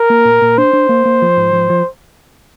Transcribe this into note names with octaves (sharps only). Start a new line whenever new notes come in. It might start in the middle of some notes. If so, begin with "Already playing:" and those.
Already playing: A#4
A#3
A#2
A#2
D4 C5
D4
A#3
A#3
F3
G#2
F3
F3